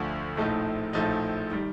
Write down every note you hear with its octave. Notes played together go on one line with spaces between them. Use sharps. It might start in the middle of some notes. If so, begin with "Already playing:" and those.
Already playing: D2 D3 F3
A#1 A2 F3 A3 D#4
A#1 A2 F3 A3 D#4
D#3 G3